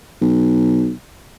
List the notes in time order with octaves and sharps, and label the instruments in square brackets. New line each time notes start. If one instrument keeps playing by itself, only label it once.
[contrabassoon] B1